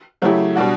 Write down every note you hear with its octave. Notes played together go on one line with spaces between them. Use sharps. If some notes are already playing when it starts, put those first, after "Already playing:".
C#3 F#3 A3 E4 G4
B2 G3 D4 F#4